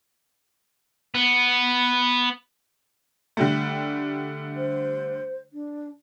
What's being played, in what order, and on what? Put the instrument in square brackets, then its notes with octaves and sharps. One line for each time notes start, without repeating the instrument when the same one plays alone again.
[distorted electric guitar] B3
[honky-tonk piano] D3 G3 A3
[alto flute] C5
D4